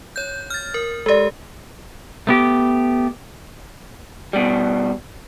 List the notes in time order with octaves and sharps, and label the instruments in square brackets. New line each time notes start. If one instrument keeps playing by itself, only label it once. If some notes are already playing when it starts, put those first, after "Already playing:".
[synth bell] C#5 G6
F6 A6
A#4
[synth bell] G#3 G4 [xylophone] A4 D5
[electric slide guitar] A3 B3 G4
[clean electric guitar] B2 G3